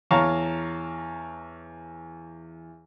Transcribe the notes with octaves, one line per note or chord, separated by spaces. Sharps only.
E2 C#5 F5 A5 A#5 C#6